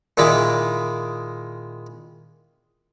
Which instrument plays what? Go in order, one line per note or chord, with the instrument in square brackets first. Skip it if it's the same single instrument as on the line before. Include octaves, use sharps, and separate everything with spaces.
[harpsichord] A#2 D#3 G#3 E4 B5 D6